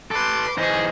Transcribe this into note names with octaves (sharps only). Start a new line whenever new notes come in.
A4 B4 C6 D6
E3 D#4 G#4 C5